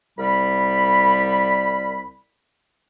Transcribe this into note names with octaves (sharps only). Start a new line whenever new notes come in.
C2 G3 B5